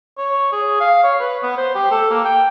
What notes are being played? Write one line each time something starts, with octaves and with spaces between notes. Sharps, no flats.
C#5
G#4
F5
C#5
B4
B3
C5
G4
A4
A#3
G5